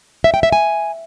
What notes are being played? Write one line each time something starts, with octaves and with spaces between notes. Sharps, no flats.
E5
G5
E5
G#5